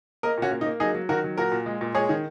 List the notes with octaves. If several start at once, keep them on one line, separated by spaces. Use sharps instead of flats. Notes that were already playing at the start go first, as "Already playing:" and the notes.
A#3 A#4 D#5
A#2 C#4 F#4
A#3
D#4
A#3
F#3 D#4 G#4
F#3
D#3 F#4 A#4
F#3
A#2 F#4 A#4
A#2
G#3
A#2
G#3 G#4 C#5
D#3